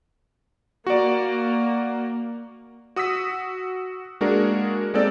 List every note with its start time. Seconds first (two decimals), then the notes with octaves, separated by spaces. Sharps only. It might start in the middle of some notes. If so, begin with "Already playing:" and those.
0.87 A#3 F#4 D5
2.96 F#4 D#6 E6 B6
4.21 G#3 A#3 D4 F#4 G#4 A#4
4.94 G#3 A#3 C4 D#4 A4 D5